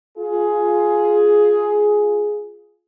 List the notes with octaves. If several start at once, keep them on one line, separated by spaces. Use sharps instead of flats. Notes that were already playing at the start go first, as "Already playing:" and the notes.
F4 G#4